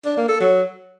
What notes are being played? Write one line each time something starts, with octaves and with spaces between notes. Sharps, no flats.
D4
A#3
A4
F#3